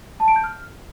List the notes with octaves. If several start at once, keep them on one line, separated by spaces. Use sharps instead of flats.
A5
D7
G6
F6